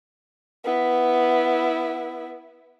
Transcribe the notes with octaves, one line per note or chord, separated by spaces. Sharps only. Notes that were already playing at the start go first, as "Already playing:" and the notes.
B3 E4